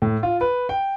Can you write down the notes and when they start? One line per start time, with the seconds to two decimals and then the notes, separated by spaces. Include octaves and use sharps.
0.02 A2
0.23 F4
0.41 B4
0.69 G5